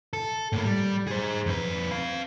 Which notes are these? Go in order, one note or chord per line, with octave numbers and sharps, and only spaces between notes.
A4
A2 A#3
G3
G#4 C5
F2 B4
C4 F5